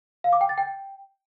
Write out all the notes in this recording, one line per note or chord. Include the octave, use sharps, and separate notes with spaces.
F5
D6
G5
A6
G5